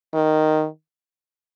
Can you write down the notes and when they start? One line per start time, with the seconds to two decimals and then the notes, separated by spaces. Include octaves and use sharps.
0.14 D#3